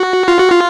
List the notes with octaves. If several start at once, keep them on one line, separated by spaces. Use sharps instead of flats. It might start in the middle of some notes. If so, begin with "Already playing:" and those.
Already playing: F#4
F4
F#4
F4